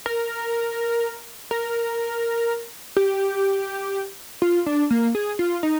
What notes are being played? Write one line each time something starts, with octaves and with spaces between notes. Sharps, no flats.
A#4
A#4
G4
F4
D4
A#3
G#4
F4
D#4